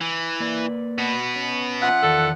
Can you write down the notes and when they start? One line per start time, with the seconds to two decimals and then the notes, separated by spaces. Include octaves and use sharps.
0.01 E3
0.40 A#3 B4 D5
0.98 B2 B3
1.36 C#4
1.82 F3 E5 F#5
2.03 E2 D#3 A4 D5